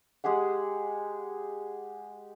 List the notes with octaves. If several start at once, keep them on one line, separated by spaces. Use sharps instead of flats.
G#3 G4 G#4 F#5